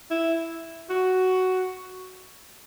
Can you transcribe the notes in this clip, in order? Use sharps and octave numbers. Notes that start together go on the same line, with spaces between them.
E4
F#4